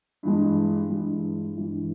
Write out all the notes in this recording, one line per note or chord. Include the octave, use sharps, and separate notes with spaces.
G2 E3 G#3
G2 E3 G#3
G2 E3 G#3